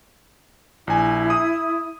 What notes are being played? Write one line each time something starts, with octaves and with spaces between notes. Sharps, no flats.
A#1 E4 G#5
D#6